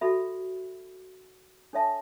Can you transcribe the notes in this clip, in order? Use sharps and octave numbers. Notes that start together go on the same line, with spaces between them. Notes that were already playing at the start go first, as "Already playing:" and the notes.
F#4 A4 E5 B5
D4 A4 C#5 E5 A5